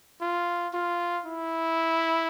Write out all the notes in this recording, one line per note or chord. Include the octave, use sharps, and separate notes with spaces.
F4
F4
E4